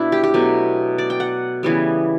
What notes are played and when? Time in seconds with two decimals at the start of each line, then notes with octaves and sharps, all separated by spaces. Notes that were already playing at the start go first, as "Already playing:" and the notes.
Already playing: B2 D4 E4
0.12 G4
0.24 G4
0.34 B2 F#3 A3
0.98 D5
1.10 G5
1.20 F#5
1.63 C#3 E3 G3 B3